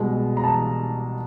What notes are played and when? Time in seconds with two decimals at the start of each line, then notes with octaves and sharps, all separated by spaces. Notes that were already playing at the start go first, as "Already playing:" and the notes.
Already playing: C2 B2 G#3
0.37 A#5
0.44 A5